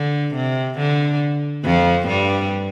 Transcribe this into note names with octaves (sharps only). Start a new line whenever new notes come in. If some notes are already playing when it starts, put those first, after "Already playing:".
Already playing: D3
C3
D3
F2 F3
G2 G3